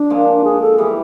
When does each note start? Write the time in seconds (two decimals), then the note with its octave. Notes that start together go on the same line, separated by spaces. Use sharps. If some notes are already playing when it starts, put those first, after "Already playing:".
Already playing: D4
0.10 A#2 F3 G#3
0.44 G#4
0.61 A4
0.78 E3 G3 B3 G#4